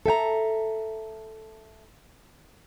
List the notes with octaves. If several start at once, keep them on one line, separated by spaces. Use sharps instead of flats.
A4 E5 G5 A#5